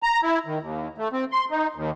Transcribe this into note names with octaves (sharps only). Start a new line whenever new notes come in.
A#5
E4
D#3
D#2
A3
C4
C6
D#4
D#2